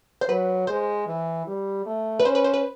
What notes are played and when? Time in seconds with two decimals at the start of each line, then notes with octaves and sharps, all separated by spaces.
0.21 C5
0.28 F#3 B4
0.67 G#3 C5
1.07 E3
1.47 G3
1.86 A3
2.20 B4
2.25 C#4 C5
2.35 B4
2.44 C5
2.54 B4